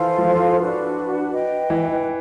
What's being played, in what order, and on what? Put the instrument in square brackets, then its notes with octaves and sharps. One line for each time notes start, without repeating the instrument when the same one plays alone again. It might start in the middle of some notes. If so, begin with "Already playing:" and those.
Already playing: [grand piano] E3 [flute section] F4 A4 C5 F5
[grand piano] F3
E3
[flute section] D4 F#4 B4
B4 D#5 G5
[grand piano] E3